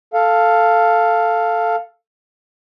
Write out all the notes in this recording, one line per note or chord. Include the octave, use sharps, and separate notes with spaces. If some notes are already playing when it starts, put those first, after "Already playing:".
A4 F5